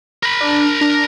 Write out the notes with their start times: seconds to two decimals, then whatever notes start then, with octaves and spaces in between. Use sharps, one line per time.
0.23 A#4 B5
0.41 D4
0.81 D4